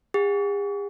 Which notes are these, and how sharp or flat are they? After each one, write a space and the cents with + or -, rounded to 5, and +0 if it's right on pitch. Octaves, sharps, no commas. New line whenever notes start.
G#4 -45 F#5 -15